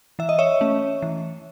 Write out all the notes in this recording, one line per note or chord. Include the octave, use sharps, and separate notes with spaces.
E3 E5
D#5
C#5 E5
A3 C#4
E3